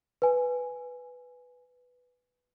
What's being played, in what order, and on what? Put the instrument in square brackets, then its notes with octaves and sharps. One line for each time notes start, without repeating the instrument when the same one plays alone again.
[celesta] B4 G#5